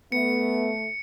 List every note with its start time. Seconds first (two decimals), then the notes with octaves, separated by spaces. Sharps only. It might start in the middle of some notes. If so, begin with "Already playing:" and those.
0.12 A3 B3 C#7